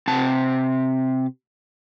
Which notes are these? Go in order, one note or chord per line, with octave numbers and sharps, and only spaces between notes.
C3 A5